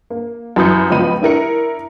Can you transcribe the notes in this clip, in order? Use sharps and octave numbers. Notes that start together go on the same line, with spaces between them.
A#3
F#2 E3 B5 D#6 G6 C#7
C#2 F3 B3 D#5 B5 D#7
D4 E4 A#4 C#7